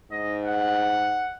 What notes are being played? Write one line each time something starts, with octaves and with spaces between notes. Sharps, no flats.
G#2 D#5
F#5